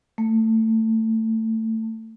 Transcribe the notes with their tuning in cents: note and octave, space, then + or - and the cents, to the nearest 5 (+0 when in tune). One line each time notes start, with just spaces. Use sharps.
A3 +20